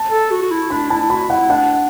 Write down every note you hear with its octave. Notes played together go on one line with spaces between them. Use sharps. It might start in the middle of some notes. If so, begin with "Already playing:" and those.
Already playing: A5
A4
F#4
F#4
E4
D4 B5
E4 A5
E4
F#4 B5
E4 F#5
E4
D4 F#5